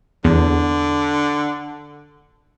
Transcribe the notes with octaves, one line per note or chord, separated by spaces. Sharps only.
E2 D3